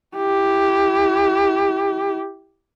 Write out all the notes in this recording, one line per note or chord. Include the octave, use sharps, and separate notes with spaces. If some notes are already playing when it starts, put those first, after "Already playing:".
E4 G4